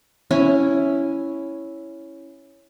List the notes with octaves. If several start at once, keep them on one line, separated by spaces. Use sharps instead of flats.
C#4 E4 G#5